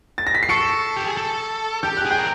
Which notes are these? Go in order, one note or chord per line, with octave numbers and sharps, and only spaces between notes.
A6
A#6
B6
C7
A4 C#6 C#7
G4
G#4
A4
G4 G6
F#6
G#4
G5 G6
A#4